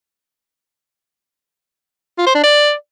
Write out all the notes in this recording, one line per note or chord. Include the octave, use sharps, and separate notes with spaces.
F4
C5
D4
D5